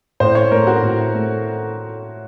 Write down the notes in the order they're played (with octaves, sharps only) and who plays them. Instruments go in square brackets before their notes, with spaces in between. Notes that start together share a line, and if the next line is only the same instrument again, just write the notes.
[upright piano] A2 C5
C#5
A3 A#4
F#4
A2
A3